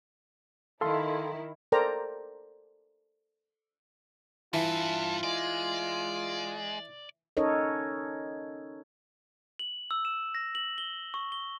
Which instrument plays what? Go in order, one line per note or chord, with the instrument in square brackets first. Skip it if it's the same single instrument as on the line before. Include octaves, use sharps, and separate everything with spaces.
[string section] D#3 E4 [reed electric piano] A4 F5 C6
[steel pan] A4 A#4 C5 D5 G5 A#5
[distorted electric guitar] G2 B4 [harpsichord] E3 [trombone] F4 [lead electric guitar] A4
[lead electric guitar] G#3 [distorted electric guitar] D5
[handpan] C#4 D#4 A4 A#4 C#5 D#5
[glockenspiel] F#7
E6
E7
A#6
F#7
G7
C#6
G7